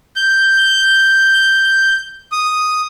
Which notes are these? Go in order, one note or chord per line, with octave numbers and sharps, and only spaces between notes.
G6
D#6